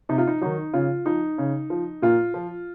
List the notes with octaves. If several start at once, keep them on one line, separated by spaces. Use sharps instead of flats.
C3 D#4
F4
D#4
D#3 F#3 D#4
C#3 F4
F3 D#4
C#3
F3
A#2 F4
F3